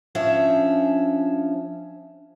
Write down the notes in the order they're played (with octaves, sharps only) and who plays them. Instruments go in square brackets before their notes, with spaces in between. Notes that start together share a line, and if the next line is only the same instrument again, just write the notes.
[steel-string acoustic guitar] F3 C#4 D4 E5